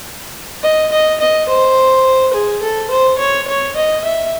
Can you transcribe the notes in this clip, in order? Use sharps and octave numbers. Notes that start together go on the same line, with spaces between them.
D#5
D#5
D#5
C5
G#4
A4
C5
C#5
C#5
D#5
E5